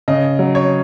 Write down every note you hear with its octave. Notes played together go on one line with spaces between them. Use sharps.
C#3 D#5
F#3
C#5